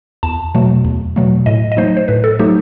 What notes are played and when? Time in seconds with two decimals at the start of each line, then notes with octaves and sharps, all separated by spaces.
0.23 E2 A5
0.55 B2 F#3 A3
0.85 E2
1.16 B2 F#3 A3
1.46 A2 D#5
1.72 D#5
1.77 F#3 A3 D#4 C5
1.97 C5
2.08 A2 B4
2.24 A4
2.39 F#3 A3 D#4 G4